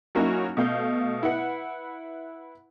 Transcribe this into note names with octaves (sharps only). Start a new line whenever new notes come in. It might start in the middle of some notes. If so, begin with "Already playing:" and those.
F#3 A#3 C#4 D#4 E4 F#4
B2 A3 F5 G6
E4 B4 F#5